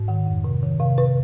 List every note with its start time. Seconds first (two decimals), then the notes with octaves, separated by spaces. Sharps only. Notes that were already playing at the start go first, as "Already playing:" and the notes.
Already playing: G#2
0.08 D#3 F#5
0.26 F2
0.44 C3
0.63 D#3
0.80 C3 F5
0.98 C3 B4